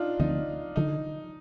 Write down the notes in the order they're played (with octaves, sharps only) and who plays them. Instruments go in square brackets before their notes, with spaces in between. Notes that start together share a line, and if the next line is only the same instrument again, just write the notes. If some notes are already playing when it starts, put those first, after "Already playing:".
Already playing: [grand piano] D4 D#4 F4
[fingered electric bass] D2 D3 F3 C4 [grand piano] D#4
[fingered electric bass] D3 F3 [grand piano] D#4